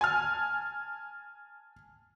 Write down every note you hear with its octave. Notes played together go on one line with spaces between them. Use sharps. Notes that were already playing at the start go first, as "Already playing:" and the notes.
G#5 A5 F6